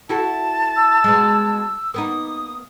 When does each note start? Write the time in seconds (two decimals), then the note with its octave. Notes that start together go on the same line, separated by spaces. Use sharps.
0.09 E4 F#4 A4 A5
0.77 E6
1.04 B2 G#3
1.94 A#3 B3 D#4 D#6